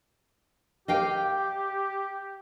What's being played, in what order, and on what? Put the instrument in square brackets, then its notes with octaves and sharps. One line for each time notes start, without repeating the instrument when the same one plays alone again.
[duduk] G4 [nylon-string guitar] D#5 F5 G5